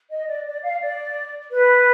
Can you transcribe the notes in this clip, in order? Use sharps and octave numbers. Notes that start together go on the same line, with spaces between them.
D#5
D5
D5
F5
D5
B4